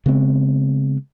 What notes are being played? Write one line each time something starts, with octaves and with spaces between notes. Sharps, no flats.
C#3 G#3 B3 C4